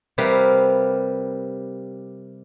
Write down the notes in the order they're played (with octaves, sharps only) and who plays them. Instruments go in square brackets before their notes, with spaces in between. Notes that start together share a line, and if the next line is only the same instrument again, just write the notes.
[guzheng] C3 G3 A#4 B4 F5